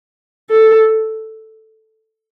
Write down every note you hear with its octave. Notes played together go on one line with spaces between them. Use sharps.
A4